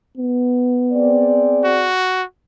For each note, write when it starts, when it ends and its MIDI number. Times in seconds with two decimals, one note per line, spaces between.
0.18 1.70 59
0.92 1.90 60
0.92 1.90 68
0.92 1.90 74
1.64 2.24 66